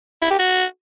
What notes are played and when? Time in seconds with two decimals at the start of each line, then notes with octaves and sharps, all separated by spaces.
0.22 E4
0.30 G4
0.39 F#4